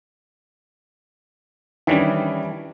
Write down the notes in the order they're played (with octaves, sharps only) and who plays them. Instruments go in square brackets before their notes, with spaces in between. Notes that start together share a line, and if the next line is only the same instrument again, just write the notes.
[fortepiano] D#3 C#4 D4 [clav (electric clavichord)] E3 G3